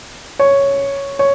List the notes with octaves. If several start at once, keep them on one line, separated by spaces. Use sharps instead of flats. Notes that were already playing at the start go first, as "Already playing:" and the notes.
C#5
C#5